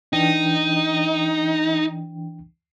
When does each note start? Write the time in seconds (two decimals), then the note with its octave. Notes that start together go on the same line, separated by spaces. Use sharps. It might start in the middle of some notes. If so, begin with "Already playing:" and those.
0.13 E3 D4 D#4 G5